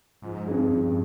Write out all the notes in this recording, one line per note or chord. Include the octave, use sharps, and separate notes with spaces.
G#2 F3
G2 C4 D#4 G#4
G2 F3